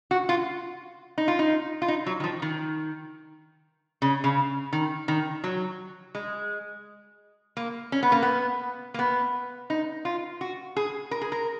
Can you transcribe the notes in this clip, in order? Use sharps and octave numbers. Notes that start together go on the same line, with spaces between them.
F#4
F4
D#4
F4
D#4
F4
D#4
F#3
D#3
F3
D#3
C#3
C#3
D#3
D#3
F#3
G#3
A#3
C#4
B3
A#3
B3
A#3
B3
D#4
F4
F#4
G#4
A#4
G#4
A#4